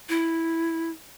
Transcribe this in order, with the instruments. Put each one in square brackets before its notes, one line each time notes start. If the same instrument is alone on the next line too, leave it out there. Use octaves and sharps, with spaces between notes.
[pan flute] E4